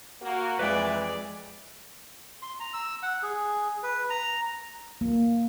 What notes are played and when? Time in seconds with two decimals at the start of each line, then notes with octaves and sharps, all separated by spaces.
0.21 A#3 F#4
0.59 F2 E3 G#3 B4 D5 E5 G5
2.42 C6
2.60 A#5
2.73 E6
3.02 F#5
3.23 G#4
3.83 B4
4.10 A#5
5.01 A#3